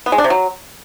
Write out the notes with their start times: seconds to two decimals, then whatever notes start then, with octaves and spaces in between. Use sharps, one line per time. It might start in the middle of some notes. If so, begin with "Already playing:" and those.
0.06 B3
0.12 G#3
0.18 D4
0.24 C3
0.30 F#3